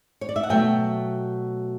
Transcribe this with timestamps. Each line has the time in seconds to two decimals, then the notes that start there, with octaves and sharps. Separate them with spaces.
0.21 C#5
0.29 D5
0.36 E5
0.43 F#5
0.49 B2 F#3 A3 E5 G5